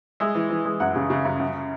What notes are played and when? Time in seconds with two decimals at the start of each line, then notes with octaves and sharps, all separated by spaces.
0.20 G#3 E5
0.35 E3
0.50 E3
0.65 G#3
0.80 F#2 F#5
0.96 C#3
1.10 C#3
1.25 F#2
1.40 F#2